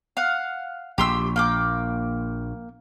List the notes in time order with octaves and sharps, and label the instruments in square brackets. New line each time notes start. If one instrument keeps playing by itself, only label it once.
[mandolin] F5 F#5
[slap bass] A#1 [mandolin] G4 C6 E6
[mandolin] A#3 G5 D6